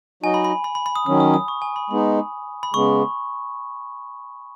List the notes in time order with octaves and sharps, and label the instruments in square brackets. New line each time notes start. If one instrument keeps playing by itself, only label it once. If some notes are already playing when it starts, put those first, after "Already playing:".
[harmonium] F#3 D#4 F#4 D#5 [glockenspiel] G#5
[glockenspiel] B5
B5
B5
B5
B5
D#6
[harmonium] D#3 F#3 C#4 [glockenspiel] D#6
[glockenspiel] D#6
D#6
C#6
G#5
B5
[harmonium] G#3 B3 D#4 [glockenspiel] B5
[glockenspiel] B5
[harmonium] C#3 G#3 B3 [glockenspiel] C#6